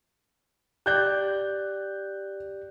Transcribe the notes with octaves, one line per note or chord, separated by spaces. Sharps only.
G4 D5 F#6 G6 G7